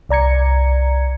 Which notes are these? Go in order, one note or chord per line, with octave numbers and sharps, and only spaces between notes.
C2 D5 A#5 G#6 C#7